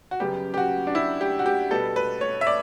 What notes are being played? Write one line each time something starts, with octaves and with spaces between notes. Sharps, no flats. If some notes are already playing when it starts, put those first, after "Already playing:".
F#4
F#2 C#3 G3 B3 G4
G4
F#4
D4
E4
G4
F#4
G4
B2 G3 B3 A4
B4
C#5
E5
D5